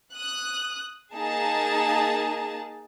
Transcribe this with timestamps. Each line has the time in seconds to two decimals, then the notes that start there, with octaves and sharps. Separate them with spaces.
0.14 D#6 F#6
1.16 A#3 D#4 G#4 A5